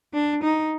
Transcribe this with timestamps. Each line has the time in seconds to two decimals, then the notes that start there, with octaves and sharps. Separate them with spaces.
0.14 D4
0.43 D#4